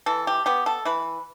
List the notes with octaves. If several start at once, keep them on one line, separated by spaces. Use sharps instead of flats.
E3 A4
G4
B3 G4
A4
E3 B4